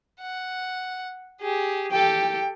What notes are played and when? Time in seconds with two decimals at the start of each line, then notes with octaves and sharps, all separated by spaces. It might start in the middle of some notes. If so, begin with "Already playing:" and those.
0.20 F#5
1.40 G4 G#4
1.91 G4 A4 G5